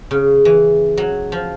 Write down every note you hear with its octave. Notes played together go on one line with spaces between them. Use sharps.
C#3
E3
F#3
F3